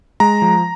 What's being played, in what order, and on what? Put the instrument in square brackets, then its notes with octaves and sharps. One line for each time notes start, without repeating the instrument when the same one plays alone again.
[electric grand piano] G#3 A#5
F3